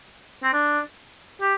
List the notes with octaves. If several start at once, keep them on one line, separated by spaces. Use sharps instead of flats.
C4
D4
G4